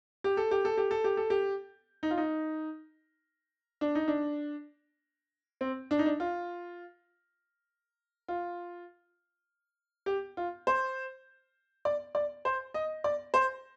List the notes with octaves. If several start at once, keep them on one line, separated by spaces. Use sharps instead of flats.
G4
A4
G4
A4
G4
A4
G4
A4
G4
D#4
F4
D#4
D4
D#4
D4
C4
D4
D#4
D4
F4
F4
G4
F4
C5
D5
D5
C5
D#5
D5
C5